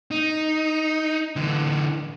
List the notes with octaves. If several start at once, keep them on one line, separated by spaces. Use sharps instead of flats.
D#4
D3 E3